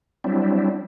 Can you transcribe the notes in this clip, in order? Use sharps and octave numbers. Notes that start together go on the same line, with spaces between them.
F#3 G3 C4 D4 E4